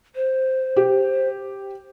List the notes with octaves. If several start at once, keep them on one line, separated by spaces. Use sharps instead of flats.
C5
G4